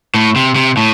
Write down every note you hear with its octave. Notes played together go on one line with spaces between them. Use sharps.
A2
C3
C3
A2